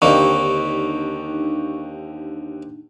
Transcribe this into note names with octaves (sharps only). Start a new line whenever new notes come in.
D#2 D3 A#3 C4 D4 D#4 G4 C#6